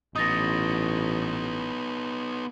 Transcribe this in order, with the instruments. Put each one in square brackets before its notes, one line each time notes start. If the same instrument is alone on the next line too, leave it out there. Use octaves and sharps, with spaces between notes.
[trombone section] A1 [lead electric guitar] B3 D#4 [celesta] D#6 A6 A#6